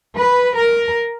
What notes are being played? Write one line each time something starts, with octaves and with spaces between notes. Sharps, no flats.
B4
A#4